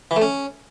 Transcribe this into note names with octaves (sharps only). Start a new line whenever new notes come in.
E3
A3
C#4